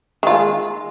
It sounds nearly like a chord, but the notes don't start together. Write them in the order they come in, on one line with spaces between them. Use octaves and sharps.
D#3 F4 G#3